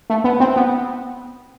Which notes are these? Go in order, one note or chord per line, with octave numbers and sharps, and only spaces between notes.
A3
B3
C4
B3